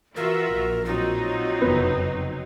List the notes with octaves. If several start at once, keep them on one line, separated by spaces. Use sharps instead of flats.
E3 F4 F#4 A#4 E5
A#1
F#3 C4 D#4 F4
F#1 F2 C3 B3